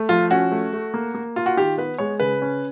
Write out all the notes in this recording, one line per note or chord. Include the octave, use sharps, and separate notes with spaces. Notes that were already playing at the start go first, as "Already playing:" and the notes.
Already playing: A3
F3 F4
C#4 F#4
A3
A3
A#3
A#3
F4
F#4
D#3 G4
B3 B4
G#3 C#5
C#3 B4
C#4